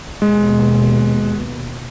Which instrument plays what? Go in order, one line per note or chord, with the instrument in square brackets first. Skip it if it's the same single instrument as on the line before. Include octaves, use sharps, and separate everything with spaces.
[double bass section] D#2 B2 [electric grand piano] G#3